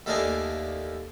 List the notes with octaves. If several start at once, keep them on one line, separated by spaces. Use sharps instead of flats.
D#2 A3 A#3 D4 D#5 G#5